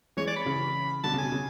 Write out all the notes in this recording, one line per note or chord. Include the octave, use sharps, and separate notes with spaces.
E3 G#3 C#5
D5
B5
C#3 E3
B2 D3 A5
C#3
G#5
B2
C#3